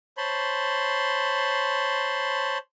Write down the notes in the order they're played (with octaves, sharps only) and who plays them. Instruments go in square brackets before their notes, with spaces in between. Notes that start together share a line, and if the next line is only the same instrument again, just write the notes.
[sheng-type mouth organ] C5 C#5 A5 B5 C6